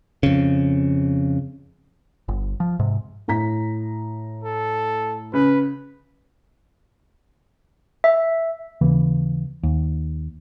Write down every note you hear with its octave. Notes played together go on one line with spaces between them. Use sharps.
F2 C#3
G1
F3
G#2 C3
A2 A#5 B6
A4
C#3 B4
E5
D#2 C#3 E3
D#2